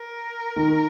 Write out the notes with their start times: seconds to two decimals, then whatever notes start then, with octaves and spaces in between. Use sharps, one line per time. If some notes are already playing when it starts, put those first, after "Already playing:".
Already playing: A#4
0.56 D#3